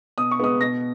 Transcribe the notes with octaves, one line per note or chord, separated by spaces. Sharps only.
B2 D#6
C#6
G#3 B3 D#6
B2 A#6